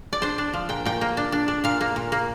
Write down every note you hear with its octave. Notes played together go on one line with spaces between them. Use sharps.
D5
D4 C5
D4
F3
A#2 G5
A#2 G5
A#3
D4
D4
D4
A#2 F5
A#3
A#2
A#3